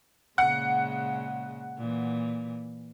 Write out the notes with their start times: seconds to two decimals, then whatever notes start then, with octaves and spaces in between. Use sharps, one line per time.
0.38 A#2 C#3 G#3 F#5
1.77 A#2 E3